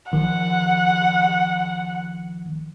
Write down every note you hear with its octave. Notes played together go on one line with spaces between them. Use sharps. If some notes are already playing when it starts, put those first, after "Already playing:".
A1 D#3 F3 F#5